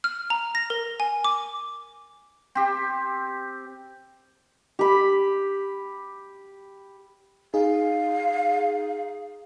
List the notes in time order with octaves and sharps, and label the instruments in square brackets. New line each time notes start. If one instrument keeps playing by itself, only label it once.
[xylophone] F6
A#5
A#6
A#4
G#5
D6
[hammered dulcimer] C4 G4
G4 B5
[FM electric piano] D#4 G#4 [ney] F5